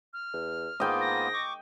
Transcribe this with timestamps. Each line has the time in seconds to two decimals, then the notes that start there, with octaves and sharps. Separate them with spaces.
0.13 F6
0.33 E2
0.80 G#2 A#3 B3 F4 D#5 G5
1.01 A#6
1.34 C#6 D6